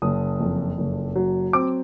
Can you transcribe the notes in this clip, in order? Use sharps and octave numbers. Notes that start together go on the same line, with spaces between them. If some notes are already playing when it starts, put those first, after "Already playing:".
F#1 D#6
F2
F#1
F#3
C4 D6